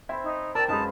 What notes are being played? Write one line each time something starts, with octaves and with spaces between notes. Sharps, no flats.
C4 E4 E5
D#4
A#4 D5 G5 A5 E6
F#2 G#3 C4 D#4 B4 F5 A5